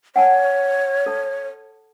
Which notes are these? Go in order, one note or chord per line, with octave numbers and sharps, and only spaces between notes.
C#5 F#5 G#5 A5
A4 A5